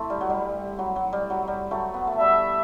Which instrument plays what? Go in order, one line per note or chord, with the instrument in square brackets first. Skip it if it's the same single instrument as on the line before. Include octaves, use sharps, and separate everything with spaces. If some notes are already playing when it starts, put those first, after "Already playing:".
Already playing: [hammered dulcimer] A3 C4 E4
G3
F#3
G3
F#3
F#3
G3
F#3
G3
F#3 A3
B3
A3
[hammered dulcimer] G3 B3 [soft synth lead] E5